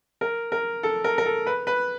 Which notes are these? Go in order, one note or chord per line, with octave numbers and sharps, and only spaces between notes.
A#4
A#4
A4
A#4
A#4
A4
B4
B4